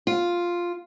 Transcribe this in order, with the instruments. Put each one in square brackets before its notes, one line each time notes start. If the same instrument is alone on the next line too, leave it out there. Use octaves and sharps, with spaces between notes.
[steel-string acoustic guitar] F4